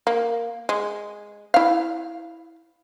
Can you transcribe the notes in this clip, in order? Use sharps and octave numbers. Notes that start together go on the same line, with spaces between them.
A#3
G#3
E4 F5